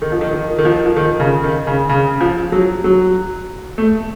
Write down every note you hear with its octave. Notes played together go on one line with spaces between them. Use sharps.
D#3
F3
D#3
D#3
D#3
F3
F3
D#3
C#3
D#3
C#3
C#3
F3
F#3
F#3
A3